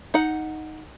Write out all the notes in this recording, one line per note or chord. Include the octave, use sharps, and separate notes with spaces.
D#4 F#5